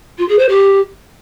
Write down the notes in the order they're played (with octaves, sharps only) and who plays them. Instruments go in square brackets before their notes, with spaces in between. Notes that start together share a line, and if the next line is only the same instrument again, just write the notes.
[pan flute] F4
G#4
C5
G4